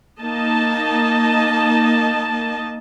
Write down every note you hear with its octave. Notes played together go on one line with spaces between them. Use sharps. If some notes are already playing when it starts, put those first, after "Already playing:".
A#3 D#4 D#5 A5